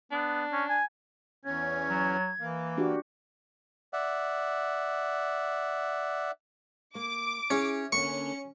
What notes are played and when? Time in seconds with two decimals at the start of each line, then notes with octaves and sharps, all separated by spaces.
0.12 B3 D4
0.52 C#4
0.69 G#5
1.45 E2 C#4 G#6
1.90 F#3
2.40 E3 A#3
2.78 D4 F#4 G4
3.93 D5 E5 F#5
6.95 A#3 D6
7.50 C#4 E4 G#4
7.92 D3 A#3 C#4 C#6